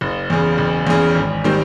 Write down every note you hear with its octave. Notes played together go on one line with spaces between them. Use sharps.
F#1
E2 C#3
F#1
E2 C#3
G#1
D#3 G3 C4